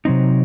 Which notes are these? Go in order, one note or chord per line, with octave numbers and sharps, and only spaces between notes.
C3 F#3 C4 D#4